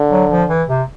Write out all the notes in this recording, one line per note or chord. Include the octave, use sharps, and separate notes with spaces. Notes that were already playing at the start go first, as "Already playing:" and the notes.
Already playing: D3
F#3
F3
E3
C3